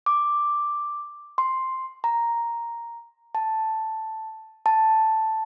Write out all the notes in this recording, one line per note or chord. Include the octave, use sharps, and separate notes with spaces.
D6
C6
A#5
A5
A5